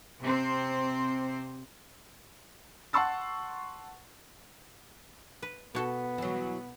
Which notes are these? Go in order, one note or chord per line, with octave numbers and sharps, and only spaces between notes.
C3 C4 C5
F#5 A5 C6 C#6 E6 A6
B4
B2 B3 F#4 A4
E3 F#3